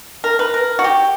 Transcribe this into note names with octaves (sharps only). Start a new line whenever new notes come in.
A#4
B4
A#4
F#4
G4